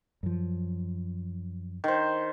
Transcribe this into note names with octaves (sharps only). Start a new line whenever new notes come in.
F#2 F3
D#3 C5